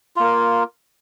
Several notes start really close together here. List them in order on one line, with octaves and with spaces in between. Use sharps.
F4 A#3 A#4